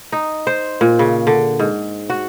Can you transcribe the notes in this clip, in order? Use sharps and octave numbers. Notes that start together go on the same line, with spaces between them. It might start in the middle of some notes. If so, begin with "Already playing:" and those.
D#4
C5
A#2
C#3
D3
G#2
F#4